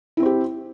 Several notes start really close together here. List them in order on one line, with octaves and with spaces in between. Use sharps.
E4 C4 C5 G4